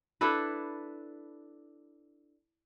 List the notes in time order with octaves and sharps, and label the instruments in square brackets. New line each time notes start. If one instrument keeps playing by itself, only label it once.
[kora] D4 E4 A4 B4